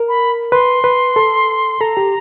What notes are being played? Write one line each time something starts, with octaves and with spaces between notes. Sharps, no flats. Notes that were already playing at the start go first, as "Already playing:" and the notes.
Already playing: A#4
B5
B4 C6
B4
A4
A4 A#5
G4